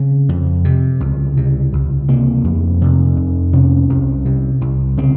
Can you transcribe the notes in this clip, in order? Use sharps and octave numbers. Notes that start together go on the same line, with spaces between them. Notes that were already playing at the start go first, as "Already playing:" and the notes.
Already playing: C#3 C4
F2
C3
C#2
C3
C#2
C3 A#3
F2
C3
F2
C3 C#4
C2
C3
C2
C#3 C4